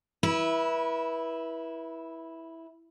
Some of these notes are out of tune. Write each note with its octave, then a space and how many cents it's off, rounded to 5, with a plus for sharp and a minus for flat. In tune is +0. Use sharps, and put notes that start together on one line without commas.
E4 -5 B4 -30